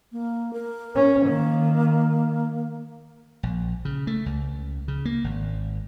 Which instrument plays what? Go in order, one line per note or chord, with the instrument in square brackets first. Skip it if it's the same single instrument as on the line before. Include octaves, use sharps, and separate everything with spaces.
[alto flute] A#3
A#4
[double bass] C#4
[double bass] D#3 [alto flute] A#3
[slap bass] A#1
C#3
A3
C#2
C#3
A#3
G#1